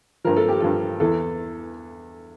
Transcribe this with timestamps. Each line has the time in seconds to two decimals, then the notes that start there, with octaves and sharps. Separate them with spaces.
0.25 G2 F3 A#4
0.36 A4
0.49 G4
0.60 G2 F3 A4
1.00 E2 E3 A4